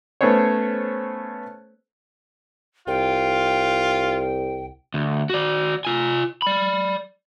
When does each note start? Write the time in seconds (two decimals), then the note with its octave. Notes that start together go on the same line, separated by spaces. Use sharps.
0.21 A3 B3 C#4 C5 C#5
2.88 C2 F4 G5
4.94 D2
5.30 F#4 D5
5.85 F4 G#5
6.42 D5 B5